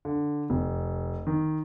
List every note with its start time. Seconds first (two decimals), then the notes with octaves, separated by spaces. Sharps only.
0.05 D3
0.50 F1
1.27 D#3